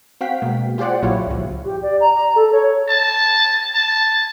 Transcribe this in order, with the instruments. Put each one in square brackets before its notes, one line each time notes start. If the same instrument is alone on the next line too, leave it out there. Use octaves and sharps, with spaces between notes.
[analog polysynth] C4 F#4 F5 G5 B6
B2 G#3 A#3
F4 G4 G#4 C5 D5 F#5
A#1 A#2 F#3 E4 F4 C#5
C#2 G2 F3
[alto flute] G4
D5
A#5
A#5
A4
C#5
[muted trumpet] A5
A5